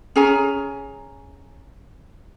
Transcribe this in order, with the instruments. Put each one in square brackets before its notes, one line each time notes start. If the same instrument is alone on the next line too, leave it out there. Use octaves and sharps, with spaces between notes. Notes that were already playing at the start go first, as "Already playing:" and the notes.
[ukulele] C#4 G#4 G#5 A#5